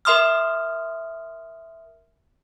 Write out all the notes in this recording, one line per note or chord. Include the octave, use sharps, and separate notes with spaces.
A#4 E5 C6 D#6 F6